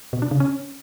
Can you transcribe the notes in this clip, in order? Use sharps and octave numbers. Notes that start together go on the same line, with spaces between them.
B2
D4
C#3
C#4